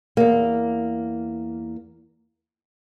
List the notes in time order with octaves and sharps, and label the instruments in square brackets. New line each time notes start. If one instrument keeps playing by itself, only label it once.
[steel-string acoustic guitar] E2 A#3